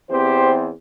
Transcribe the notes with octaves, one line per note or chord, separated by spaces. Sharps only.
E2 E3 C4 G4 C5